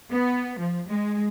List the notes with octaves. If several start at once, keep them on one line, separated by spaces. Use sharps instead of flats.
B3
F3
G#3